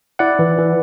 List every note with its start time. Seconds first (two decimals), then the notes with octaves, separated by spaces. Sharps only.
0.19 E4 D5 F#5
0.39 E3
0.58 E3